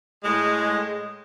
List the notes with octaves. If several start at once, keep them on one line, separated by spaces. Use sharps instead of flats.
A2 G#3